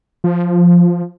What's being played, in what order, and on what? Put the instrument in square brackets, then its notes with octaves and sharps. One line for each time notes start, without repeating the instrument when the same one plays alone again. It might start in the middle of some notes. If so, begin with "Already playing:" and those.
[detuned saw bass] F3